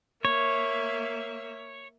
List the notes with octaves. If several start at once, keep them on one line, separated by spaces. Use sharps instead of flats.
A#3 C#5 E5